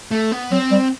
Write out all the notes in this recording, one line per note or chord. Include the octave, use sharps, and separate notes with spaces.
A3
B3
F#3 C4
G3